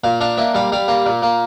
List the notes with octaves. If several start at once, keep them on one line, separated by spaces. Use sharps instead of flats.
A#2 F5
D4 F5
A#3 E5
G3 F5
G3 F5
A#3
A#2
A#3